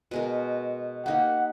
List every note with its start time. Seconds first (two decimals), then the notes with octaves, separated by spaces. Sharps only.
0.11 B2 G#3 A#4
1.06 A#3 D#4 G4 F#5